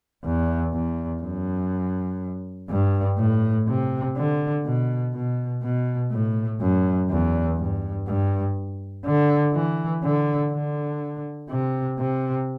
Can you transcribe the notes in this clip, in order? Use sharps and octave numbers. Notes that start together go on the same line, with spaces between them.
E2
E2
F#2
G2
A2
C3
D3
B2
B2
B2
A2
F#2
E2
G2
G2
D3
E3
D3
D3
C3
C3